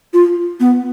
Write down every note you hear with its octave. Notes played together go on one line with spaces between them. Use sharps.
F4
B3